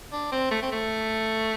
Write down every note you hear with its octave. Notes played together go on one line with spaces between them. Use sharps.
D4
C4
A3
C4
A3